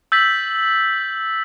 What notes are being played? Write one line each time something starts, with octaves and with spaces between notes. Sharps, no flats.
E6 G6 A6 B6 F#7